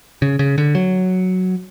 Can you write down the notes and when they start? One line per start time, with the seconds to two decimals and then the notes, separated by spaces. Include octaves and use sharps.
0.22 C#3
0.39 C#3
0.58 D3
0.75 F#3